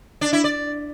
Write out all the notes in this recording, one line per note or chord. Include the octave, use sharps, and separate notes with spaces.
D4
E4
D5